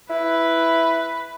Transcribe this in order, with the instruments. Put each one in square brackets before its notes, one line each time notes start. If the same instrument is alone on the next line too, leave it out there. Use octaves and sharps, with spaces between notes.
[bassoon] E4 [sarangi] B4